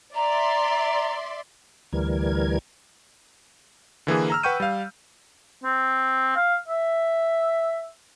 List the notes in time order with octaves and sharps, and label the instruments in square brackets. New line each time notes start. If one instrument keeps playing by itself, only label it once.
[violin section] D5 E5 C6 [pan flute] A#5
[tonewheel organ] D2 E3 G3 A#4 G#6
[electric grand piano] D3 E3 A#3 G#4
A#5 E6 F6
B4 F#5 G5 C#6 G6 D#7
G3 F5
[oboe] C4
F5
E5